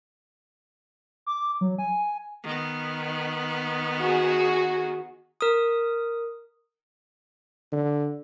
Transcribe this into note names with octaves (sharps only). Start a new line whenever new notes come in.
D6
F#3
G#5
D#3 B3
F#4 G#4
A#4 D#6
D3